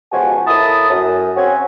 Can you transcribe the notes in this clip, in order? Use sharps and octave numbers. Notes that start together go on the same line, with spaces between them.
C#2 B2 F3 F#4 G4 G#5
A2 A#3 E4 A5 D#6
F#2
C4 C#4 F#4 G#5